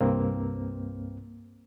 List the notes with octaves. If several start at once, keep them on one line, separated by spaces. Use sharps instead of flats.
C2 G2 A#3 C4